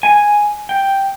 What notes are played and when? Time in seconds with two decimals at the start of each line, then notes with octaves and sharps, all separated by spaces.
0.03 G#5
0.69 G5